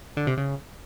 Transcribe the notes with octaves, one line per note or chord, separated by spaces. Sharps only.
D3
C3
C#3